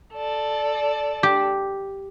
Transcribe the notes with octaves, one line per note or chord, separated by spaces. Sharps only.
A4 D5
G4